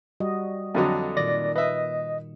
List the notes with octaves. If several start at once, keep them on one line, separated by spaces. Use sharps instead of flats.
G3 F#4 D#5
F2 D3 F#3 D#5
A#2 D#3 D5 A#6
B4 D#5 E5